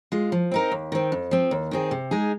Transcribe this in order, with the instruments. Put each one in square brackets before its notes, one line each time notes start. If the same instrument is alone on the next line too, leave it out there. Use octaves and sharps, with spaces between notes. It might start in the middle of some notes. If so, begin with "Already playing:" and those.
[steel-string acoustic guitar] G#3 F4
F3
C4 D#4 A#4
D#2
D#3 C4
F2
F3 C4
D#2
D#3 C4 G#4
C3
G#3 D#4 G#4